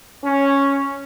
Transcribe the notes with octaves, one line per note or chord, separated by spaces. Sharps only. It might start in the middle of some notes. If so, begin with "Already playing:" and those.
C#4